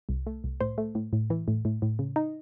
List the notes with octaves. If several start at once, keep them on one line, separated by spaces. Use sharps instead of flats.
C2
A3
C2
A2 C5
A3
A2
A2
E3
A2
A2
A2
C#3
D#4